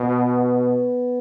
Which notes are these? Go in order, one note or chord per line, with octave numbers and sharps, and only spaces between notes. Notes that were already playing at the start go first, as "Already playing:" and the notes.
Already playing: B2 B3